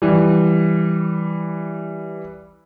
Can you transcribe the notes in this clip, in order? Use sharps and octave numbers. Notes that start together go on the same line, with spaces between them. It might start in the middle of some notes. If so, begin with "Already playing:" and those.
E3 G3